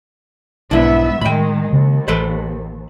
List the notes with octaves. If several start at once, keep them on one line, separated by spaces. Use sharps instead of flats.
B1 G#2 G3 B3 D4 E4 E5
A2 D#3 G#3 G5 B5
D#2 C#3
A1 A4 B4 C5